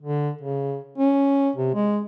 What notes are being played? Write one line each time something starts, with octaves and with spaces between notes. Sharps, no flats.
D3
C#3
C#4
C3
G#3